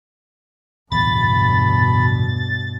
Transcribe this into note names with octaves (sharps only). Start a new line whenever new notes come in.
D1 E2 G2 B2 B5 A6